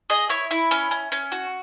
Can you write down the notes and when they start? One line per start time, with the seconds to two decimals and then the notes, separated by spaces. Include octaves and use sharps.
0.10 G#4 D#5
0.29 E4 C#5
0.51 E4
0.71 C#4
0.91 C#4
1.12 C#4
1.32 F#4